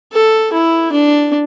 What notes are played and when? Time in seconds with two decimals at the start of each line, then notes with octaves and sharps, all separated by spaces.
0.13 A4
0.53 E4
0.92 D4